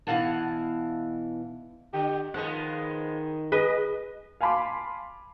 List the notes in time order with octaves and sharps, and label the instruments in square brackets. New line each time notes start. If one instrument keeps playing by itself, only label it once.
[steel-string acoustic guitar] B2 E3 E4 F5 F#5 A5
[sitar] D3 [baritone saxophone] G4
[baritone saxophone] D#3 [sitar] F3 G#3 B3 [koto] F#5
[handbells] G#4 [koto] B4 [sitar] D#5
[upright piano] F5 G#5 A5 B5 C6 D6